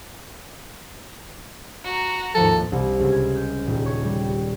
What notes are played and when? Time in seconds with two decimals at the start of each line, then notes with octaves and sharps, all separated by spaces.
1.84 F#4 A#5
2.35 D#2 G#2 F3 A4
2.72 C2
3.00 C#2
3.11 G#6
3.35 G6
3.67 D#1
3.86 C#5
4.05 G3